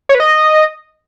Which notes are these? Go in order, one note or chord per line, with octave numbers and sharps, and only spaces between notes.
C#5
B4
D#5